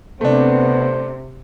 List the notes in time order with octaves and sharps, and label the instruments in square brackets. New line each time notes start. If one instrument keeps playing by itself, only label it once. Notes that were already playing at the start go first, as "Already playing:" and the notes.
[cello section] C3 [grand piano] A3 D4 [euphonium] B3 [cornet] C5